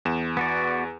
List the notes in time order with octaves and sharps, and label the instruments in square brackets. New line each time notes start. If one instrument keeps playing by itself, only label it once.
[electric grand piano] E2 E7
[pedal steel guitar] B3 F#4 D5